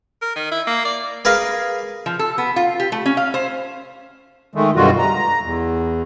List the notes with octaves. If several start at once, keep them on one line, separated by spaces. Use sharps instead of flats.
A#4
D#3
E4
A#3
D5
G#4 A#4 B4 F5
F3
A4
B3
F4
G4
A3
C#4
F5
C5
D#3 G#3 A3
F#2 B2 D3 G3 F4 F#4
A#5
E2